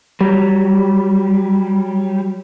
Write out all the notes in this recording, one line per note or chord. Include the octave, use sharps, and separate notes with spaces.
F#3 G3